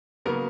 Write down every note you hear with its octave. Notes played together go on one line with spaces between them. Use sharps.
C#3 F#3 A#3 B3 A#4